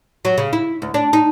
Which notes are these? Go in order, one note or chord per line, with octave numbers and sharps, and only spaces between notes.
F#3
C#3
E4
D2
D4
D#4